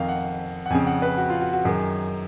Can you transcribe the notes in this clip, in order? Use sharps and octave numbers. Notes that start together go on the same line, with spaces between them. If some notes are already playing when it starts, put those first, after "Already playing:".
Already playing: F2 D#3 F5
F#5
F#5
F2 C#3 G#5
F#5
B4
F#4
F4
F#4
F#4
F#2 D#3 G#4